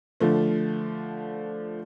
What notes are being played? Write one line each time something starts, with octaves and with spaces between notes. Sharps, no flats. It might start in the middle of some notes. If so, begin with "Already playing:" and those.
D3 F3 A3